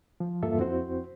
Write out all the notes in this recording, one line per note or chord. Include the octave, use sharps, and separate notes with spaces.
F3
E2 G2 A#3 F4 A4 E5
F2 C4 E4 F#4 C5